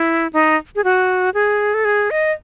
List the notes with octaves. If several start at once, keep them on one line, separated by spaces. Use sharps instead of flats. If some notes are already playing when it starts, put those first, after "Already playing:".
Already playing: E4
D#4
G#4
F#4
G#4
A4
G#4
D#5